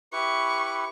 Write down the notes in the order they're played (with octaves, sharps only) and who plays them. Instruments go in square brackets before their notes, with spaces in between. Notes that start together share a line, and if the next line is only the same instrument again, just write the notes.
[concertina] E4 G4 B4 [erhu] C#6